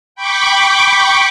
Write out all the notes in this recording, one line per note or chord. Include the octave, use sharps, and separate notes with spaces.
G5 B5 C#6 D6